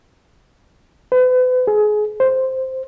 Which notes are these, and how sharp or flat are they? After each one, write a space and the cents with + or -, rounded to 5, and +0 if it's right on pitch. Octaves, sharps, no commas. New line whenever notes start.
B4 +40
G#4 +25
C5 +0